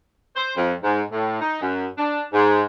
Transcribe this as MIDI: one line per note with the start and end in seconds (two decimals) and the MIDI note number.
0.36 0.52 72
0.57 0.73 41
0.83 1.01 44
1.11 1.37 45
1.41 1.59 63
1.61 1.87 42
1.98 2.22 62
2.33 2.62 44